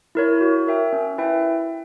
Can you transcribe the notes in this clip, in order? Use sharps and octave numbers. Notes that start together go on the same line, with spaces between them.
E4 A#4 C#5
F#4
A#4 E5 G5
C#4
E4 B4 E5 G5